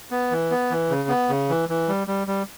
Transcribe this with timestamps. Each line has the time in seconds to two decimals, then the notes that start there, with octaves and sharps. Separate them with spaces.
0.11 B3
0.31 E3
0.51 B3
0.71 E3
0.90 C#3
1.09 B3
1.29 C#3
1.49 E3
1.69 E3
1.88 G3
2.07 G3
2.27 G3